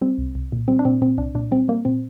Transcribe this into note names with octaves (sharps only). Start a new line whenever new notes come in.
G3 C4
C2
C2
A#2
G3 C4
D4
A#2 C4
A#2 C4
C2 D4
A#2 D4
G3 C4
G3 A#3
A#2 C4